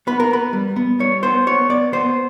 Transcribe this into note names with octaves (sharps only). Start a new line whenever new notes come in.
B3 B4
A#4
B3 B4
G3
B3
G3 C#5
B3 C5
B3 C#5
B3 D5
B3 C5